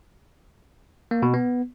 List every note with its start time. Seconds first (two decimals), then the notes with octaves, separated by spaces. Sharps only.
1.11 A#3
1.22 B2
1.34 B3